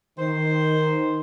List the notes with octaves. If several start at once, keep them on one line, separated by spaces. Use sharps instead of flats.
D#3 C5